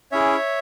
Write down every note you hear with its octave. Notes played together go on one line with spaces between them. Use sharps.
C#4 E4 G#4 C#5 E5